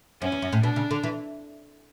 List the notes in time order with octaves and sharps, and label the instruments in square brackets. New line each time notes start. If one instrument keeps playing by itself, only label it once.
[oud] F#2 [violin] C#4
[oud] E2
F#2
A2
[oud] B2 [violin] D4
[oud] C#3
D3
E3